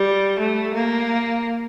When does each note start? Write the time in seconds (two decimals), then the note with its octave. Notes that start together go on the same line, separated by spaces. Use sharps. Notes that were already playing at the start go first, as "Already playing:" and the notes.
Already playing: G3
0.39 A3
0.74 A#3